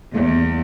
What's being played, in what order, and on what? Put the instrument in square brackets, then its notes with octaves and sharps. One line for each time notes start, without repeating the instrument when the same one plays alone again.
[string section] E2